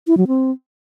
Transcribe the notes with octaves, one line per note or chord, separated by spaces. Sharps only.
E4
F#3
C4